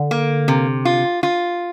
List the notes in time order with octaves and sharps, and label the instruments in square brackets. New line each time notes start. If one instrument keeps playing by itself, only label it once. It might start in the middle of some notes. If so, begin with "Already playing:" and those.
Already playing: [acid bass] D3
[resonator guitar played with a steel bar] A#3
C3
F4
F4